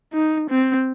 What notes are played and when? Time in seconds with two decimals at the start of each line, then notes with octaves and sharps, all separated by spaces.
0.13 D#4
0.50 C4